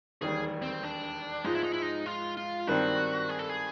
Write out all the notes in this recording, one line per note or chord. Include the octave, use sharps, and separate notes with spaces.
E1 D#2 D#3 G3 G#4
C4
D4
G#2 F3 G#3 D#4
E4
D#4
E4
D#4
F4
F4
G2 D#3 G3 C4 F#4
G#4
A4
G#4